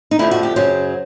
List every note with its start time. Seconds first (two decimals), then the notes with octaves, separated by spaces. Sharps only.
0.11 D#4
0.19 F2 D3 F3 A3 E4
0.31 F#4
0.43 G4
0.56 F#2 C#3 F#3 C5